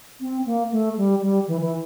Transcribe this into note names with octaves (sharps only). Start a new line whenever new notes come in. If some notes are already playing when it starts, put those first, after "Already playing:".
C4
A#3
A3
G3
G3
E3
E3